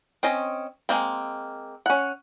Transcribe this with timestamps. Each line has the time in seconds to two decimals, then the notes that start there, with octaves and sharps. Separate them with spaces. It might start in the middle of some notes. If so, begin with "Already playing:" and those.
0.23 C4 C#4 D#5
0.89 G#3 A#3 C4
1.86 C#4 F#5